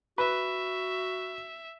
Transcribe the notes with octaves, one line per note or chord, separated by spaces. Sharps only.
F#4 B4 E5